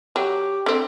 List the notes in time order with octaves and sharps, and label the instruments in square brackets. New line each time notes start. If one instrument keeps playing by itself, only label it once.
[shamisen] F#3 [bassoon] G4
[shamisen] D3 C4